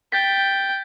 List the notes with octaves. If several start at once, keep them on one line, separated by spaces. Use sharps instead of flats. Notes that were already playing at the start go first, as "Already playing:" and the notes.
G5 G6 A6 B6